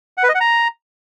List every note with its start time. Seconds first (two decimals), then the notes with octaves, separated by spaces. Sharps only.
0.17 F#5
0.23 B4
0.29 D#5
0.35 F#5
0.40 A#5